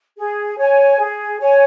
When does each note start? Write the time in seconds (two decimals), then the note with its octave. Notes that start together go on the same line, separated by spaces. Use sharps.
0.17 G#4
0.57 C#5 G#5
0.99 G#4
1.40 C#5 G#5